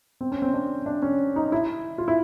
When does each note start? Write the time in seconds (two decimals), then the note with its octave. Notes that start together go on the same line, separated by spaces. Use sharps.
0.21 C4
0.32 C#4
0.42 C4
0.54 D4
0.86 D4
1.02 C#4
1.36 D#4
1.52 E4
1.98 F4
2.08 E4